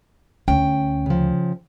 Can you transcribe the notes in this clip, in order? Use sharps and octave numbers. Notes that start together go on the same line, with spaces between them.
D2 C#4 G5
C#3 F3